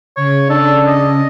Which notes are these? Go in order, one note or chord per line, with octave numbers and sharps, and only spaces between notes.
C#3 C#5
D4 A4
D#5